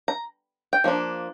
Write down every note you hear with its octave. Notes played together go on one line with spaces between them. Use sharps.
A#5
G5
F3 A#3 D4